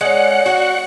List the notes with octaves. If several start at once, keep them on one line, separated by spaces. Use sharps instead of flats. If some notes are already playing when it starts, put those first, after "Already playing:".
G#3 C#4 D5 F#5
F#4